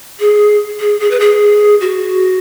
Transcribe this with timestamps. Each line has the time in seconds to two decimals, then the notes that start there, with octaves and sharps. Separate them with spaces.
0.20 G#4
0.80 G#4
1.00 G#4
1.11 B4
1.20 G#4
1.81 F#4